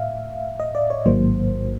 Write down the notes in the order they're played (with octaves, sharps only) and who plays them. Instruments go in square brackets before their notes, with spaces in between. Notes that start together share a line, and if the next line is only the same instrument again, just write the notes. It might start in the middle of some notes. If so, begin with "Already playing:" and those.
Already playing: [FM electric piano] A2 E5 F5
D#5
D5
C#5
A1 G#2 D#3 F#3 A#3 C5